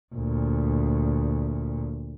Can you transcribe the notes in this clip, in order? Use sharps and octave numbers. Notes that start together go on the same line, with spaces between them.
D2 A#2